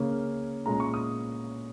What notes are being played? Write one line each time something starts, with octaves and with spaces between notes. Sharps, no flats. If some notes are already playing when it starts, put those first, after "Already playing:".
Already playing: C#3 A#3 C#4
A#2 G#3 C#4 A#5
C#6
D#6